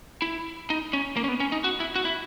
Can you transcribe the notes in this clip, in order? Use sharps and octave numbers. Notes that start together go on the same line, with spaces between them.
E4
D#4
C#4
A#3
C#4
B3
C#4
D#4
F#4
E4
F#4
E4